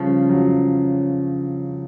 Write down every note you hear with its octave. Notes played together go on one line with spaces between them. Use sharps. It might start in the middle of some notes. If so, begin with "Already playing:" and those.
Already playing: C#3 F3 G3 D4
F#3